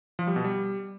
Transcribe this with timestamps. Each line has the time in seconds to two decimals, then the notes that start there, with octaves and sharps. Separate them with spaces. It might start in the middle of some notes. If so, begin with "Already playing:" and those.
0.19 F3
0.27 G3
0.36 B2
0.44 G3